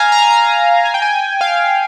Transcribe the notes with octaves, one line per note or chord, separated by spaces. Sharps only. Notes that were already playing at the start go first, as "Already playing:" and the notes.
Already playing: F5 G#5 A#5
A#5
G#5
A#5
G#5
G5
G#5
F5